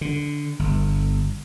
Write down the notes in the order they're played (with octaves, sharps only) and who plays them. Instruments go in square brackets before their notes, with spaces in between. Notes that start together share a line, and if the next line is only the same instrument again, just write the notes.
[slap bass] D3
G1